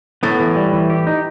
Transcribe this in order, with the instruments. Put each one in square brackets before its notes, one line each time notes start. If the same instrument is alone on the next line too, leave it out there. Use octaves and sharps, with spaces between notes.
[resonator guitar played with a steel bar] A2 [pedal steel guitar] B3
[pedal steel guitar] E3
G3
E3
G4
D#4